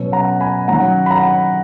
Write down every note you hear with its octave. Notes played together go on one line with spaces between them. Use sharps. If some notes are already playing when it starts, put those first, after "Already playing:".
Already playing: B2 F#3 C#4
F#5 A#5
G#5 B5
D#3 F#3 C#4 F#5 A#5
B5
F#5 A#5